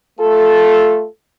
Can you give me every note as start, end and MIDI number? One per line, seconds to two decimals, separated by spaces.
0.19 1.05 57
0.19 1.05 65
0.19 1.05 69